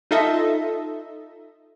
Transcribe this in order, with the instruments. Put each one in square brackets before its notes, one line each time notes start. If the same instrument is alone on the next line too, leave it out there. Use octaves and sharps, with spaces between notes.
[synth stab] D#4 F4 A4 D#5 E5